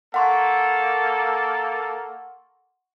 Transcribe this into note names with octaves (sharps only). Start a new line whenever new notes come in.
A#3 A4 F#5 C6 C#6